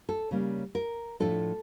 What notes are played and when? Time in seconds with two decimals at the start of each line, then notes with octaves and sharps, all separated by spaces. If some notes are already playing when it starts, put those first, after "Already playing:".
0.09 A4
0.31 C#3 G3 A#3 C#4
0.75 A#4
1.20 A2 F3 A3 D4 A4